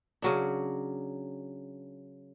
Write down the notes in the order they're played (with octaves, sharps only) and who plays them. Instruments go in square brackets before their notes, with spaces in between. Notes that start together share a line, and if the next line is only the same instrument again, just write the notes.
[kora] C#3 F#3 D4